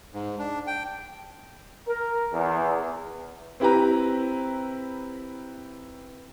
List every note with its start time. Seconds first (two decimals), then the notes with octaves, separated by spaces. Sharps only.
0.13 G#2
0.39 D4
0.67 G5
1.87 A#4
2.33 E2
3.60 C4 E4 G4 B4 A#5